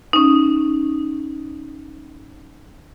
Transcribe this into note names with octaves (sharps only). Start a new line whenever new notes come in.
C#4 D#4